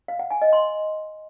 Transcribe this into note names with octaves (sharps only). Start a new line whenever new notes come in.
F5
F#5
G#5
D#5
C6